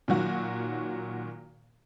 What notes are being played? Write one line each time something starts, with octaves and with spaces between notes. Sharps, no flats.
A#2 D#3 F#3 F#4